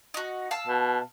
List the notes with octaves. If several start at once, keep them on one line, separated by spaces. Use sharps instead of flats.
D#4 F#4
F5 A5 E6
B2